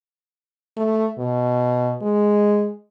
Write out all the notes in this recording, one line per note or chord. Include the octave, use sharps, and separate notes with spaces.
A3
B2
G#3